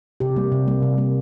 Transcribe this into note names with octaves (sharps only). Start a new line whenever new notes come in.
C3 G4
G3 A#3
C3
G3 A#3
C3
G3 A#3